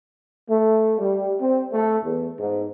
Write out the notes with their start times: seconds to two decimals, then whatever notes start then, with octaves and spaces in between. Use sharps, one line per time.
0.49 A3
0.99 G3
1.40 C4
1.72 A3
2.04 E2
2.39 G#2